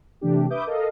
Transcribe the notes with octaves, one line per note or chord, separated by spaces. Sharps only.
C3 E3 A3 D4 G4
B4 E5 D6 D#6 G6
A4 A#4 D#5 F5